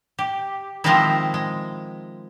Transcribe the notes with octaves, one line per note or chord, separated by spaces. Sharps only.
G4
D#3 F3 G#3 C4 D#4 E4
G#3